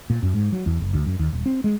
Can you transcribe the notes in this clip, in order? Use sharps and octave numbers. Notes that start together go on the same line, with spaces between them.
A#2
F#2
G#2
F#3
E2
F#1
D2
F#2
D#2
D#1
C4
G#3